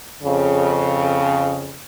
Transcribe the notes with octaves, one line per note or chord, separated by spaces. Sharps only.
F2 C#3